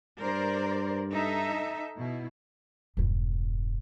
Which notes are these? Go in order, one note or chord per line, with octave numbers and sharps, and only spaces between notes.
G2 A#4 C5 D5
D#4 A4 E5
B2 E4
E1 G2